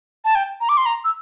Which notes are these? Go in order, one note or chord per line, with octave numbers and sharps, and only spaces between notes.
A5
G5
A#5
D6
C6
A#5
E6